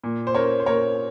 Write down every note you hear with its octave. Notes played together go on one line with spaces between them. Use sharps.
A#2
C5
C#4 A#4 C#5
C5
A#2 A#4 C#5